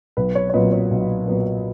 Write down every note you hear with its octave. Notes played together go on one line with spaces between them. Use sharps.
B1 B4
C#5
C#5
A#2 F#3 B3 B4 D#5
C#5
B1
A#2 F#3 B3